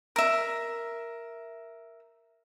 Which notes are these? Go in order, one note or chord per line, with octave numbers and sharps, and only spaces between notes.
A#4 E5